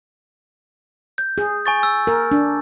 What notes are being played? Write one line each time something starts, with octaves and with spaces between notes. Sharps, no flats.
G6
G#4
G#5 C#6 A6
E6
A#4
D4